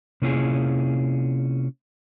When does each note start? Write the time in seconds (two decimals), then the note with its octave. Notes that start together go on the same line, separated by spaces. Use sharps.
0.22 C3 A#3 C#4 E4 F4 G#4